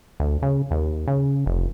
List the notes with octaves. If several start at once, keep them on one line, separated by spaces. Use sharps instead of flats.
D2
C#3
D#2
C#3
F1